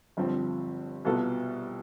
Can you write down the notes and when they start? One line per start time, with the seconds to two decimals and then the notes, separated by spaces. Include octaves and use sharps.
0.17 G1 G2 F3 C4
1.05 C2 B2 B3 F4 A4